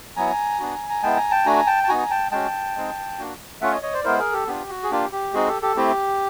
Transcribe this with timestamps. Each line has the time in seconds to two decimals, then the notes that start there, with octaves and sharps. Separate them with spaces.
0.16 F#3 B3 E4 G#5 A#5
0.60 B3 D4 F#4
0.90 A#5
1.03 G#3 B3 E4 G5 A5
1.17 G#5 A#5
1.31 G5 A5
1.45 A3 D4 F#4 G#5 A#5
1.67 G5 A5
1.84 A5
1.88 B3 D#4 F#4 G#5 A#5
2.10 G5 A5
2.32 G#3 C#4 F#4 G5 A5
2.76 G#3 C4 D#4
3.19 A#3 D4 F#4
3.61 A3 C#4 F4 E5 F#5
3.72 C#5 D#5
3.83 C#5 D#5
3.94 C5 D5
4.04 G#3 B3 E4 A#4 C5
4.19 G#4 A#4
4.33 G4 A4
4.47 B3 D4 F4 G4
4.69 F#4
4.83 G#4
4.91 A#3 D4 F4 G4
5.12 G4
5.33 G#3 C4 D#4 F#4 G#4
5.48 G4 A4
5.62 G4 A4
5.76 A3 C4 E4 G4